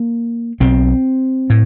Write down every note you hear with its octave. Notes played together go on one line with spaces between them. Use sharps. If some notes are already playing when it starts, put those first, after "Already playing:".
Already playing: A#3
B1 B2 C4
A2